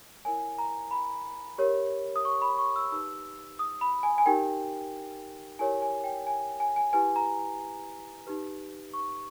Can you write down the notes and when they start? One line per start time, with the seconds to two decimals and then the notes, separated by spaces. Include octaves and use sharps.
0.25 E4 A#4 C#5 G#5
0.58 A#5
0.91 B5
1.58 G4 A#4 C#5
2.16 D#6
2.25 C#6
2.42 B5
2.58 C#6
2.76 E6
2.92 D#4 G4 B4 E6
3.59 D#6
3.81 B5
4.03 G#5
4.18 G#5
4.26 D#4 G4 A#4 G5
5.59 E4 G4 A#4 C#5 G#5
5.82 G#5
6.04 G5
6.27 G#5
6.60 G#5
6.76 G#5
6.93 E4 G4 B4 G#5
7.16 A#5
8.27 D#4 G4 B4
8.94 C#6